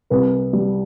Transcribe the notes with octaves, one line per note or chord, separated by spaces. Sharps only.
C2 B4
G3